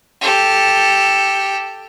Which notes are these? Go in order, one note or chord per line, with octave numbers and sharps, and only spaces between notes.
G4 A4